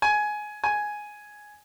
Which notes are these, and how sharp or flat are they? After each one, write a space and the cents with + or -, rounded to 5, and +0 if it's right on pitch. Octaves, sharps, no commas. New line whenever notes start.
G#5 +15
G#5 +5